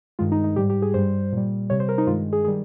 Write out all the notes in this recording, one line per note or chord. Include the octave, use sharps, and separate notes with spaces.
G2 D#3 G#3 F4
D#4
D#4
G#2 G3 G4
G4
G#4
G2 G3 C5
A#2 G3
C3 G3 C#5
C5
A#4
D#4
G2 D#3 G#3 F4
G#4
D#3 G3 G#4